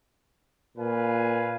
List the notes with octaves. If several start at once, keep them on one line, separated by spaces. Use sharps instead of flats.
A#2 B4 F5 G#5